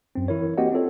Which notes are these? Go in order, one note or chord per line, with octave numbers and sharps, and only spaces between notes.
F#2 C4
E3 E4 A#4 C#5
A#3 C4 F#4 G4 D#5 F#5
C4 F4 A4 C#5